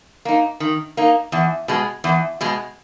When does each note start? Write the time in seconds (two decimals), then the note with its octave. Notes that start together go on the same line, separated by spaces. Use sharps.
0.25 A#3 D#4
0.60 D#3
0.97 A#3 D#4
1.32 E2
1.68 B2 G#3
2.04 E2
2.41 B2 G#3